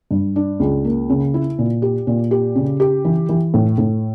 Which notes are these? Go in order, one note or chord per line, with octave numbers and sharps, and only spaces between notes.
G2
D4
C#2
A#3
C#3
E4
A#2
G4
A#2
G4
C#3
G4
E3
E3
A2
A2